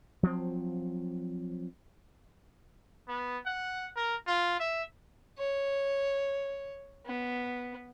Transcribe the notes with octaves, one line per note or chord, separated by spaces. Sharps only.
F3 F#3 A#3 C4
B3
F#5
A#4
F4
E5
C#5
B3